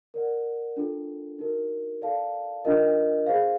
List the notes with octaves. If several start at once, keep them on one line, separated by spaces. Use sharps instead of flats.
A#4 D5 F#5
D4 F4 A4
D#4 F#4 A#4
A4 D5 F5 A5
D4 F4 A#4 D#5
G#4 C5 F5